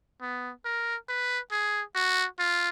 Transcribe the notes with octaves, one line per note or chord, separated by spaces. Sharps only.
B3
A#4
B4
G#4
F#4
F4